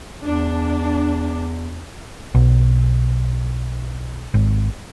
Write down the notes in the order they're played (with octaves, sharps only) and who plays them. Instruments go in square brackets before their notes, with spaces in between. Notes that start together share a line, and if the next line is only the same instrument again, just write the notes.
[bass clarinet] E2 [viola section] D4
[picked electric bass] B1
G#1